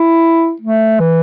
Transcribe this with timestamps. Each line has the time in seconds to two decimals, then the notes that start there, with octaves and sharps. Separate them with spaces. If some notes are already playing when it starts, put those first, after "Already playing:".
Already playing: E4
0.62 A3
1.00 E3